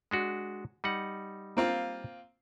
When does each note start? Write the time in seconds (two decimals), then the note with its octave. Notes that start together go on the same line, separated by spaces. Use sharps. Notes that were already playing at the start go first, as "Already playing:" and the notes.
0.11 G#3 D4 F#4
0.84 G3 D#4 F#5
1.57 A#3 C4 F4